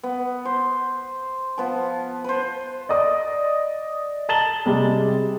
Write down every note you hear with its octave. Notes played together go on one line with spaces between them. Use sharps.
B3
C5
F3 B3 A5
B4 C5
D5 D#5 D#6
A5 A#5 A6 E7 F#7 G7
C3 G3 G#3